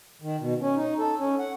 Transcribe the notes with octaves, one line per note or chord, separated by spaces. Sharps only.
D#3
B2
C#4
D#4
A4
C#4
F#5